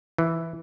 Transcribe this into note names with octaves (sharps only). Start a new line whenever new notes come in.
E3